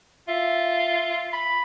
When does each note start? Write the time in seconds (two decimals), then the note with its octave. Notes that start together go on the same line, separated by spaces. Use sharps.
0.28 F4 E5
1.33 B5